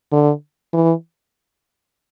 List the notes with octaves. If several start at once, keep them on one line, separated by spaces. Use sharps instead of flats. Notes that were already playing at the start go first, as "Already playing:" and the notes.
D3
E3